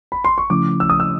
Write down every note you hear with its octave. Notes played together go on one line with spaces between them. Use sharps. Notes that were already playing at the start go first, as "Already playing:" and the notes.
B5
C6
C#6
C#3 F3 A3 C#4 E4 D6
E6
D#6
E6